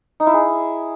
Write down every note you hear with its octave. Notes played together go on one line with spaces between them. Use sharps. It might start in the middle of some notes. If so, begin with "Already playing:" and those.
D#4
E4
G#4